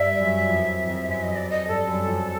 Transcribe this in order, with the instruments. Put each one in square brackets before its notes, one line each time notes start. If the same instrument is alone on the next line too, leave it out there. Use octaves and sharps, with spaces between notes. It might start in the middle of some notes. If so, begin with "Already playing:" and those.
Already playing: [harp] G2 [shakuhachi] E5
[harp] F#2
F2
F2
[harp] F#2 [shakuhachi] E5
[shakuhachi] D#5
[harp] F2
[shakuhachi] D5
D#5
[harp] G2 [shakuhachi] A4
[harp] F#2
F2